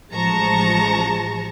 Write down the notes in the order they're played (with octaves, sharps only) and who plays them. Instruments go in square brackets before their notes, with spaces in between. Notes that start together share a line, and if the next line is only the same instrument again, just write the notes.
[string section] A1 F3 G#3 A5 A#5 C#6